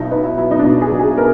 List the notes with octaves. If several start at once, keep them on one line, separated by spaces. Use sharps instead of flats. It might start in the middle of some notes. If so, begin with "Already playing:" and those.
Already playing: B1 B2 D#4 E4
B3 D#4
E4
F#3 E4
D#4
D4
B2 D#4
G#4
B1
G#4
B3 A#4